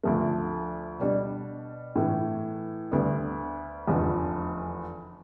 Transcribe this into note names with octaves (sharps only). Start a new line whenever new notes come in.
D2 D3 F3 A3
B2 G3 D4
A2 E3 A3
D2 D3 G3 B3
F1 E2 D3 F3